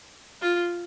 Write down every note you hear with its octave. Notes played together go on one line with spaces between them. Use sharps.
F4